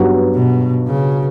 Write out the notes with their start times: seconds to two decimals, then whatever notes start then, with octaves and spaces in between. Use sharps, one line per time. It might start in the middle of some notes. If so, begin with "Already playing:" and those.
Already playing: G2 F#3 B3 F#4
0.35 B2
0.88 C#3